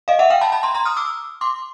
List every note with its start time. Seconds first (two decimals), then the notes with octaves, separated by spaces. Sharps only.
0.08 D#5 F5
0.19 E5 F#5
0.30 F5 G5
0.41 A5 B5
0.52 A5 B5
0.63 A#5 C6
0.75 A#5 C6
0.85 D#6 F6
0.97 D6 E6
1.41 C6 D6